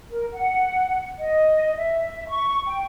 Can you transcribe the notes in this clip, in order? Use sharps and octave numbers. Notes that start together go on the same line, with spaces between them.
A#4
F#5
D#5
E5
C#6
G5